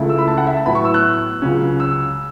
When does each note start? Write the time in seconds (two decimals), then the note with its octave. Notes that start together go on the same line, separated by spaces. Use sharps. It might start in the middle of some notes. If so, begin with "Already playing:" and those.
Already playing: C#2 C#3 A3 E4
0.09 E6
0.18 B5
0.28 A5
0.38 F#5
0.47 E5
0.57 A5
0.66 A2 F#3 B3 E4 B5
0.75 C#6
0.85 E6
0.94 F#6
1.42 C#2 C#3 F#3 C#4
1.80 E6